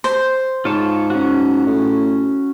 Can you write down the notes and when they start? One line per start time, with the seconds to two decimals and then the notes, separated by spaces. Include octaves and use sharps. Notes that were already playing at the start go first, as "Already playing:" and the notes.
0.04 C5
0.65 G#2 F4 C#5 A5
1.10 C#4 F#4
1.67 A2